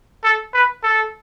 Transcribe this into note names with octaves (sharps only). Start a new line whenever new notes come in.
A4
B4
A4